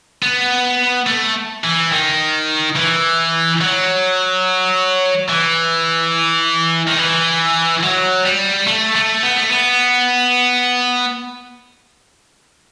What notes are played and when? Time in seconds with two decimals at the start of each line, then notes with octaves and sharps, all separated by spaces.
0.22 B3
1.07 A3
1.64 E3
1.92 D#3
2.76 E3
3.61 F#3
5.29 E3
6.87 D#3
6.98 E3
7.83 F#3
8.25 G3
8.67 A3
8.95 A3
9.23 B3
9.37 A3
9.50 B3